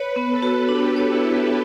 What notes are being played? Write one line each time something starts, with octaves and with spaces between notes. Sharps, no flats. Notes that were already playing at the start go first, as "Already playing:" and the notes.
Already playing: B4 C#5
B3
A4
F#4
D4 G4
C#5
E4
B3